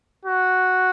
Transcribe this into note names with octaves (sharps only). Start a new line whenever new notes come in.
F#4